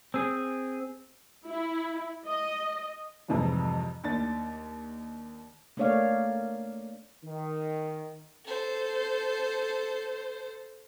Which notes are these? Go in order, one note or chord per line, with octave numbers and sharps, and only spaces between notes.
C4 G#4
E4
D#5
F2 G#2 C3 E3 F3 G3
D#2 D4 A6
A3 A#3 D4 C#5 D5 F5
D#3
A4 C5